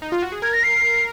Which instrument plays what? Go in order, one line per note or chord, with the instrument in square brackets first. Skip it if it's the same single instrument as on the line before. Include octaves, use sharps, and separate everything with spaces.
[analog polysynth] D#4
F4
F#4
G#4
[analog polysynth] A#4 [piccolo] G#6
[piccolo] A#6
C7